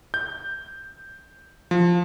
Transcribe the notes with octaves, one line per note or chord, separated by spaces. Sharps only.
G6
F3